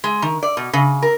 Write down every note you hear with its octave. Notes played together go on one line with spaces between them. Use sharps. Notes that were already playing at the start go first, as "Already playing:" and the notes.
G#3
D#3
D5
B2
C#3
A#4